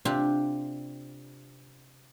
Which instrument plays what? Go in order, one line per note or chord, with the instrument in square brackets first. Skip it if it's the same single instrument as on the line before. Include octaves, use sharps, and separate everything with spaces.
[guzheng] C3 D4 F4 G4